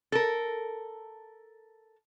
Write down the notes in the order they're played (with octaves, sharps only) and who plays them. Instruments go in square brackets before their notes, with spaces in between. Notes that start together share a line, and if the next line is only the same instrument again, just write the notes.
[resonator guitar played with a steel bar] A4 A#4